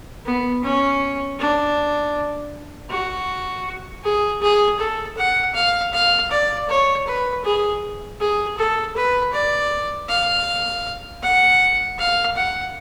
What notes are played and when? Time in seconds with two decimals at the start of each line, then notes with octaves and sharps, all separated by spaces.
0.25 B3
0.64 C#4
1.39 D4
2.90 F#4
4.04 G#4
4.42 G#4
4.79 A4
5.17 F#5
5.55 F5
5.93 F5
6.31 D5
6.69 C#5
7.07 B4
7.44 G#4
8.20 G#4
8.58 A4
8.96 B4
9.33 D5
10.09 F5
11.22 F#5
11.98 F5
12.36 F#5